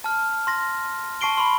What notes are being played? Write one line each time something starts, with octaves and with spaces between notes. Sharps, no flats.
A5 F6
C6 A#6
A5 C#6 C7 D7 G7
B5 C6